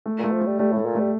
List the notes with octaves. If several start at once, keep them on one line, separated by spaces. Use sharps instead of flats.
A3
A#2 A3
F3
A3
G3
G3 A3
A2 A3
A#2
G3 A3